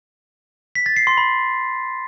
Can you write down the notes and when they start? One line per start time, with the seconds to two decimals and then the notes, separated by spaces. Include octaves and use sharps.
0.75 B6
0.86 A6
0.96 C7
1.07 C6
1.17 B5